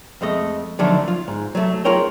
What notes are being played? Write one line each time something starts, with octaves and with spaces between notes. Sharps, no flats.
F2 G#3 A3 D#5
D3 D#3 F3 F#3 A3 D4
F4
G#2
F#3 A3
F4 G#4 A#4 C#5 G5